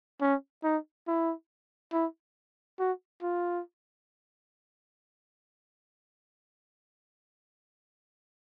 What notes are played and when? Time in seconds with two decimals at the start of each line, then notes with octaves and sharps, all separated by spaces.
0.21 C#4
0.64 D#4
1.07 E4
1.93 E4
2.79 F#4
3.22 F4